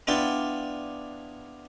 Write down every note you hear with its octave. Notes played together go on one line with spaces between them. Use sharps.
B3 D4 E4 F4 D5 G5